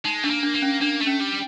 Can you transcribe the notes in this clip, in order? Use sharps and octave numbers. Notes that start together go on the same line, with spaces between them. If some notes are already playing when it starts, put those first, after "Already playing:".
G#3 D#4
A3 D4
A#3
D4
A#3
C#4
A#3 D4
A3
C#4
G3